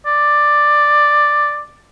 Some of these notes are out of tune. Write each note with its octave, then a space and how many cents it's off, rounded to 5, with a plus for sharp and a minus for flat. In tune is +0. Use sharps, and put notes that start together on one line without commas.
D5 +5